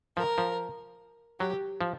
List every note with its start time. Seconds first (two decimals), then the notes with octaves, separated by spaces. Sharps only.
0.17 F3 A#4
0.38 F3
1.39 F#3 G4
1.81 F3